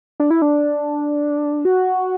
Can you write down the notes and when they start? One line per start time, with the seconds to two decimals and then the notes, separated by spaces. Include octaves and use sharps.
0.20 D4
0.30 E4
0.42 D4
1.65 F#4